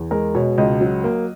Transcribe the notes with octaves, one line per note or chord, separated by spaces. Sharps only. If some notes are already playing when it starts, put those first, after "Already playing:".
Already playing: E2
G#3 A#4
B2 C#5
C#2 D#5
F#3
A#3